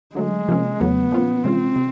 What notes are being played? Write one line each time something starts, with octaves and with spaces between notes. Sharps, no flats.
D3 F#3 G#3 A3
C3 F3 A#3 C#4
E2 C#3 F#3 A3 B3
A#2 F3 A#3 C#4 F4
C3 E3 G#3 C4 C#4 F4
C3